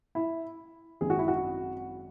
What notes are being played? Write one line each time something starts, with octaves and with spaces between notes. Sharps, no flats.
E4
G#1 F#2 D#3 G#4
F#4
E4
F#4